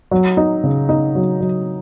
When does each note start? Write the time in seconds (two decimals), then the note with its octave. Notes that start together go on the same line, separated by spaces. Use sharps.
0.11 F#3
0.37 D#4
0.64 C#3
0.89 D#4
1.15 F#3
1.41 F#3